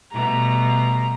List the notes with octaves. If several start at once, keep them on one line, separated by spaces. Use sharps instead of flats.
B2 G3 A3 A#5